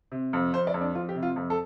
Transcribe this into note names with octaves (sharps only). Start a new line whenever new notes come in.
C3
F2
F2 C5
D5
F2
D4
F2 F4
G4
C3
F4
F2
A4